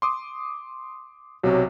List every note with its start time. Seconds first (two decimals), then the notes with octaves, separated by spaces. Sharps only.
0.02 C6 D6 D#6
1.44 B1 C3 F#3